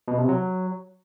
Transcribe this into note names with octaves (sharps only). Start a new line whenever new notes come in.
B2
C3
F#3